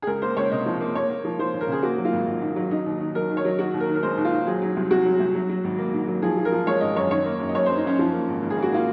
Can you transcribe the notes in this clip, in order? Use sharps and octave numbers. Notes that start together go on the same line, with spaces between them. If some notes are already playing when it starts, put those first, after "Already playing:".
G#4
C#2 A#4
A#3 C5
C#2 C#5
C3 D#5
F3
A#3
A#3 C#5
A#3
F3
F3 C5
D#2
A#4
C#3 G#4
A#3 F#4
F#3
F4
G#1
G#1
G#2
F#3
D#3 D#4
D#2
D#3
F#3 A#4
D#3
C#5
F#3
D#3 F#4
D#2
A#4
D#3
A#4
G#3 C5
D#2
F4
D#2
F#3 G#4
F#3
C2
C2 F#4
F#3
C2
F#3
F#3
G#1
A#3
G#2
F#3
F3 G#4
F3
A#4
F3
G#3 C#5
G#1 D#5
F#2 C#5
D#3 C#5
A#3
F#2
D#5
F#2 C#5
F#2 C5
D#4
F#2 C#4
F3
A#3
G#1
G#1
G#4
A#3
F#4
A#3 F4